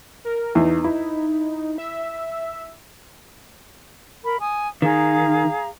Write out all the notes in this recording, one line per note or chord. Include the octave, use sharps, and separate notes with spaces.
A#4
E2 D#4
E4
E5
A#4 B5
G#5 D#6
D#3 G#4 F5 A#5